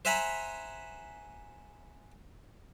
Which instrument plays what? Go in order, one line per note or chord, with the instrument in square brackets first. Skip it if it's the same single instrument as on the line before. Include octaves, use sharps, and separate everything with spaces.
[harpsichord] C5 E5 F#5 G#5 A#5 B5